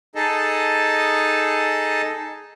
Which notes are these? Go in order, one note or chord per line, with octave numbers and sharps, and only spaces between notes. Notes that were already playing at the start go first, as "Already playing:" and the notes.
D#4 G#4 A4 D#5 A5